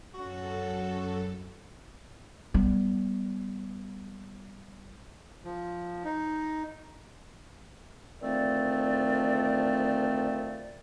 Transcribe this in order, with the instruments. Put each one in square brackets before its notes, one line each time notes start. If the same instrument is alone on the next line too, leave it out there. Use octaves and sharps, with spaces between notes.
[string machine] F#2 A4 [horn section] C#4 F#4
[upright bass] G3 B3
[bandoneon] F3
D#4
[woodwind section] D2 D#3 F3 A3 C4 D5